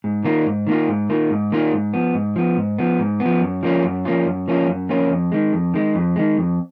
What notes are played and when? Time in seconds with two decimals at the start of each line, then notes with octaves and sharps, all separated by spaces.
0.04 G#2
0.24 D#3 A#3 F4
0.46 G#2
0.67 D#3 A#3 F4
0.88 G#2
1.10 D#3 A#3 F4
1.30 G#2
1.52 D#3 A#3 F4
1.73 G#2
1.94 F3 B3
2.14 G#2
2.36 F3 B3
2.57 G#2
2.79 F3 B3
2.99 G#2
3.20 B3
3.25 F3
3.41 F#2
3.63 F3 A#3 C#4 F4
3.84 F#2
4.05 F3 A#3 C#4 F4
4.26 F#2
4.48 F3 A#3 C#4 F4
4.68 F#2
4.89 F3 A#3 C#4 F4
5.10 F2
5.32 D#3 G#3
5.53 F2
5.74 D#3 G#3
5.95 F2
6.16 D#3 G#3
6.37 F2